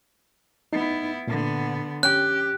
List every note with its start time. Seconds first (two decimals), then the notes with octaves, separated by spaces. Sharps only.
0.73 B3 D#4 E4
1.27 A#2 D3 B3
2.03 C#4 G4 G5 F#6